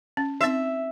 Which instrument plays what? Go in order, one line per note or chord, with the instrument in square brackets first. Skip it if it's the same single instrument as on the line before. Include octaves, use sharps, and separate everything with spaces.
[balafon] C#4
[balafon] C4 D#4 [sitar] E5